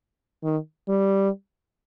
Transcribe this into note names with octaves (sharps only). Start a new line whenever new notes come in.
D#3
G3